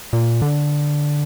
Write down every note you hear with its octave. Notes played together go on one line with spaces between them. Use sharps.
A#2
D3